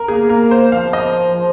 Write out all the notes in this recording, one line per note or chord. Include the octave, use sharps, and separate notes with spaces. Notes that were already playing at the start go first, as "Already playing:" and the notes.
Already playing: A#4
A#3 G#4
A#3 A#4
C5
F3 F5
D#5